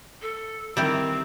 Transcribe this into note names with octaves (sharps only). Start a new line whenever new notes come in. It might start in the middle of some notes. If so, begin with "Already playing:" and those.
A4
D#3 G3 C4 E4 G4